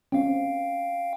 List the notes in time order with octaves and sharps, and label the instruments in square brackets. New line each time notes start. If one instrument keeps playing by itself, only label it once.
[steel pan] C4 C#4 [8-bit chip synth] F5 G5